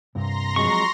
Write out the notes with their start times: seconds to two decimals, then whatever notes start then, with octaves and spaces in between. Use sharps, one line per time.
0.15 C2 G2 A#5 C6 A#6
0.56 F2 F#3 G#3 C#6